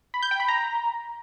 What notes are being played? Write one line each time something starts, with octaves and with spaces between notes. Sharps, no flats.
B5
G6
G5
B5
A#5